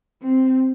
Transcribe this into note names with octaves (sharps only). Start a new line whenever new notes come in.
C4